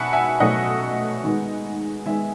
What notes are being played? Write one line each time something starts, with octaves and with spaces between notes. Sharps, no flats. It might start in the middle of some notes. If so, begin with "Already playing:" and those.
Already playing: B2 E5 F#5 G#5 A5 B5
E5 G#5
B2 F#3 A3 D#5 F#5
D#3 G#3 B3
D#3 G#3 B3 E5 G#5